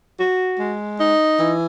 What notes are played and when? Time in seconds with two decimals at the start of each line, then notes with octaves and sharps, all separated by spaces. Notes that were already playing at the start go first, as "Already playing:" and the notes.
0.19 F#4
0.59 G#3
0.99 D#4
1.40 E3